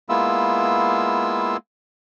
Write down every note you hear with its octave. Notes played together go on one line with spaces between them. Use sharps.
G#3 A#3 B3 E4 F4 E6